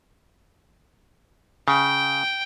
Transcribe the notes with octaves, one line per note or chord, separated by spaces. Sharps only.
C#3 G5